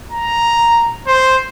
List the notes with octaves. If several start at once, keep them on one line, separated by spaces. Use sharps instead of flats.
A#5
C5